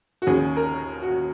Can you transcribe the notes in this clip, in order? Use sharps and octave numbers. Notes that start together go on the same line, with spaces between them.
F#4
D#2 C#3 G#4
A#4
F#4